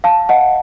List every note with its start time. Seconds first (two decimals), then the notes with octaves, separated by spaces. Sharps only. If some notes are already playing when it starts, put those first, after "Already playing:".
0.04 F5 A5
0.29 D#5 F#5